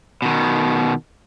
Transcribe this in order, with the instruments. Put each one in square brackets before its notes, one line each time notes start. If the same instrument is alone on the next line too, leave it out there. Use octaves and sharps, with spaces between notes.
[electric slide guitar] B2 D#3